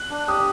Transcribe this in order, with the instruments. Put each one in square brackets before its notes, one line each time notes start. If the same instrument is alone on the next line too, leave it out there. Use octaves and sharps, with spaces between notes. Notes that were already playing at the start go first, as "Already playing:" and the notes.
Already playing: [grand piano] F#6
[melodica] D4
[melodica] G4 [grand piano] D#6